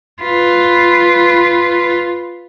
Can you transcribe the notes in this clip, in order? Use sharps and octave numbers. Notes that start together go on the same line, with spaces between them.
F4 B4